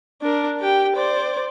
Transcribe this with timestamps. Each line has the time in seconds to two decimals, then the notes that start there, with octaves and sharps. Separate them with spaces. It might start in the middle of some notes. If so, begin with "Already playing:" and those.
0.22 D4 A#4
0.60 G4 G5
0.96 C5 D5